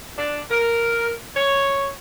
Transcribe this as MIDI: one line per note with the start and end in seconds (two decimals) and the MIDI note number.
0.17 0.41 62
0.50 1.11 70
1.35 1.89 73